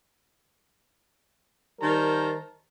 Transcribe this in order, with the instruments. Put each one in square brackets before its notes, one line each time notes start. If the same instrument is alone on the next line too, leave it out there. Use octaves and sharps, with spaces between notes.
[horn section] D#3 G3 A#4 C5 A5 A#5